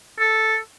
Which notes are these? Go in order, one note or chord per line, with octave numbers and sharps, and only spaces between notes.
A4